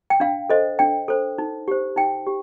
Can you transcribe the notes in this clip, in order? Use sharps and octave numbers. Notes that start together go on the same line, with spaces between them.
G5
D4 F5
A4 C5 D#5
D4 G5
A4 C5
D#4
G4 C5
D#4 G5
G4